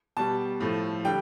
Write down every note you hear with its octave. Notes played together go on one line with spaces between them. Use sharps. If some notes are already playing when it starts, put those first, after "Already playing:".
B2 G3 A5
A2 F3 A3
D3 G3 G5